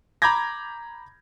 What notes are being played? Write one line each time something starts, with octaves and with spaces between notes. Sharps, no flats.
A#5 B5 D6 G6 G#6 A#6